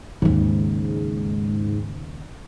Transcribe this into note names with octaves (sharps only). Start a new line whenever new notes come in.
D#2 G#2 C#3